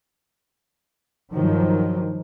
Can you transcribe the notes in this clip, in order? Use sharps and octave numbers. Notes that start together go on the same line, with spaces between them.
G2 D#3 F3 F#3